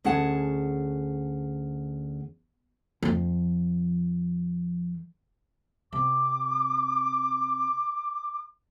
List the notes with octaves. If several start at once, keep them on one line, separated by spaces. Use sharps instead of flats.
D2 C#4 G#4 F#5 A5
F2 F3
C3 D6